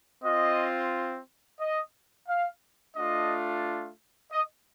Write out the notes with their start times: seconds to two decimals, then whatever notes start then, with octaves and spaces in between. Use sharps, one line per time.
0.24 C4 F4 D#5
1.61 D#5
2.28 F5
2.96 A3 D4 F4 D#5
4.32 D#5